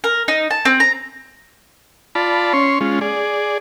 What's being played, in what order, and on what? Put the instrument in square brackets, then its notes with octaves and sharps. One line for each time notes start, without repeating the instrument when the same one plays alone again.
[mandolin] A#4
D#4
A5
C4
A#5
[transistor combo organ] F4 D5 A5 B5
C#4 C#5 C6
G#3 C#4 F4
G#4 D5